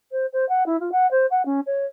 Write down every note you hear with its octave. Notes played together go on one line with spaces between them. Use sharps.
C5
C5
F#5
E4
F4
F#5
C5
F#5
C#4
C#5